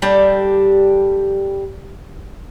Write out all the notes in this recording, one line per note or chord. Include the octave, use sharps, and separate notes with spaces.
G3 D4 G4 A4